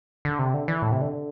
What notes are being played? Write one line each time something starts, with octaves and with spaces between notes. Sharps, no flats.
D3
C3
D3
E3
A2
C3
D3